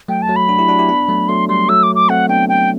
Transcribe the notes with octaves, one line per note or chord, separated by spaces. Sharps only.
F#3 A3 G5
A5
F#3 A3
B5
D4 F#4
E4 G4
D4 F#4
E4 G4
B3 D4
F#3 A3
F#3 A3 C6
G3 C6
F#3 A3 E6
D6
D6
A3 C4 F#5
B3 D4 G5
G5